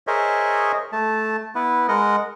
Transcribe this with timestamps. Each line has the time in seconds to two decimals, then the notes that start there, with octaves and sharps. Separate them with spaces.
0.07 G#4 A#4 C5 C#5 D#5 E5
0.92 A3 A5
1.55 B3 E4 B4
1.88 G#3 A#4 D#5 F#5